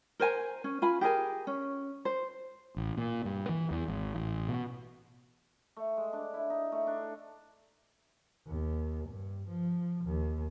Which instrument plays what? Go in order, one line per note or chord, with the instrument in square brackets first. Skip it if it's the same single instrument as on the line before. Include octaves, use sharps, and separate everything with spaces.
[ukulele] A#4 C5 G#5 A#5
C#4
F4 G#5 B5
G4 G#4 A#4 G#5
C#4
C5
[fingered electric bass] A1
A#2
G2
E3
E2
G#1
A1
B2
[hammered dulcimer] A3
G#3
D4
E4
D#4
A3
D4
[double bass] D#2
G2
F3
D#2